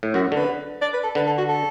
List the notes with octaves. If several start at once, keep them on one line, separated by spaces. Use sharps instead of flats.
A2
F#2 F#4
D3 B4
D5
B4
A4
D3 B4
A4
F#4
A4